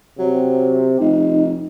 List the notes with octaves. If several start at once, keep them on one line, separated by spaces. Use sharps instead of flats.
C3 F#3
F1 D#4